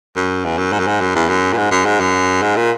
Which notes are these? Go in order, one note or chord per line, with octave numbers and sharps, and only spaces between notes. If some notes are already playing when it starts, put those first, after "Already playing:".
F#2
E2
F#2
G#2
F#2
G#2
F#2
E2
F#2
A#2
G#2
F#2
G#2
F#2
G#2
A#2